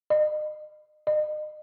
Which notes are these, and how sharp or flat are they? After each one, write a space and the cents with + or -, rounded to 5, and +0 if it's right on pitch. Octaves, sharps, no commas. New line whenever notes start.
D#5 -40
D#5 -40